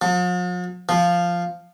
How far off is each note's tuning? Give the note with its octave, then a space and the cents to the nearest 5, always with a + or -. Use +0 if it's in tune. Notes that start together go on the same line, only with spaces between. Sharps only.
F3 +45
F3 -5